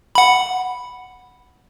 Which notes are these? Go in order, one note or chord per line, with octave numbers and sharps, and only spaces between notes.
F#5 B5